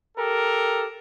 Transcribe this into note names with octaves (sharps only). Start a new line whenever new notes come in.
G4 A4 A#4